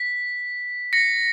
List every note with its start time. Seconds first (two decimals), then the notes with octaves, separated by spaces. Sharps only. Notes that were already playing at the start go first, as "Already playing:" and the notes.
Already playing: B6
0.93 A#6 C#7